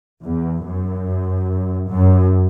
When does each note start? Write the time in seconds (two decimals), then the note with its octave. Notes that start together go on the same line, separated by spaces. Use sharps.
0.23 E2
0.66 F#2
1.89 F#2